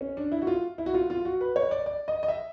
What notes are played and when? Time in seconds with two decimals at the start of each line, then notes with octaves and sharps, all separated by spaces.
0.01 C#4
0.17 D4
0.32 E4
0.42 F#4
0.47 F4
0.78 E4
0.86 F#4
0.94 F4
1.10 F4
1.25 F#4
1.41 B4
1.56 C#5
1.71 D5
1.86 D5
2.08 D#5
2.23 D#5
2.28 E5